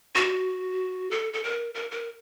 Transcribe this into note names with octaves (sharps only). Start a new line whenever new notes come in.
F#4
A4
A4
A#4
A#4
A#4